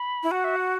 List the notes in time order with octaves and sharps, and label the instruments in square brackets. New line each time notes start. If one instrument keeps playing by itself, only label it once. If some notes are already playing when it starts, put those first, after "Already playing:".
Already playing: [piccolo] B5
[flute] E4
[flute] F#4 [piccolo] F#5
[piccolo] E5
F#5